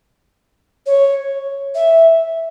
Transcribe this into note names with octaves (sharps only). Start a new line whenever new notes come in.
C#5
E5